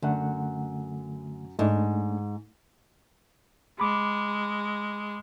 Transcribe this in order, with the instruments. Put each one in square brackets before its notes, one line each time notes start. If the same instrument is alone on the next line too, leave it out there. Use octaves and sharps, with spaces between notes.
[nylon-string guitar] F#2 [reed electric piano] D3 A3 F#5
[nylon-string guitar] G#2 [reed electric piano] A3 D4
[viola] G#3 [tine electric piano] B5 D6